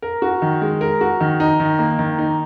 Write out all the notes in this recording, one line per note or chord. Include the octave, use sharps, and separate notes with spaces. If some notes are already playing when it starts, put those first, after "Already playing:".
A#4
F#4
D#3
G#3
A#4
F#4
D#3
D#4
D#3
A#3
D#3
D#4